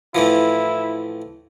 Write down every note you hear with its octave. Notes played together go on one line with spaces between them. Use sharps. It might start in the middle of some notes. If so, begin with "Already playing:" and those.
A2 E3 F3 E4